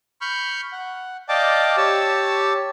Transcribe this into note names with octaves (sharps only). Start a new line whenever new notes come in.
B5 C#6 F6 G6
F#5
D5 D#5 F5 G5 A5 D6
G4 C#5 A5 E6